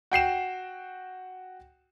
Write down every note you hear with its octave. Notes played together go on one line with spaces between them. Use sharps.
F#4 G5 C7 E7